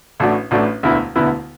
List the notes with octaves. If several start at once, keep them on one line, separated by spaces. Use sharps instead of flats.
A1 A2 A3 D4 F#4
A1 A2 A3 D4 F#4
E1 D2 D3 B3 E4
E1 D2 D3 B3 E4